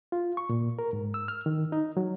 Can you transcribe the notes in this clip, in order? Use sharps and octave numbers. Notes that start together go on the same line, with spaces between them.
F4
C#6
A#2
A#4
G#2
E6
F6
D#3
D#4
F#3